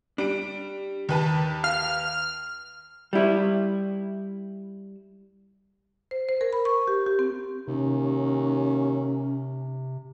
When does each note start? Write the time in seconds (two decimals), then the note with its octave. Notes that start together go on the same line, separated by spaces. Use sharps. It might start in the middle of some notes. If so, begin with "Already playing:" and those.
0.18 G3 D4 D7
1.09 D#2 D#3 B4 A5
1.64 F5 F6
3.13 G3 E4
6.11 C5
6.29 C5
6.41 A#4
6.53 B5
6.65 C#6
6.88 G4
7.06 G4
7.19 C4
7.68 D#2 C3 C#4